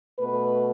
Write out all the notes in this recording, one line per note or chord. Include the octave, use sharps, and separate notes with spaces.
B2 A3 B4